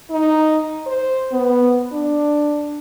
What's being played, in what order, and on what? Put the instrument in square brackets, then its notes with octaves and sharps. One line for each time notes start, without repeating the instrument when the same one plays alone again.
[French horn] D#4
C5
B3
D4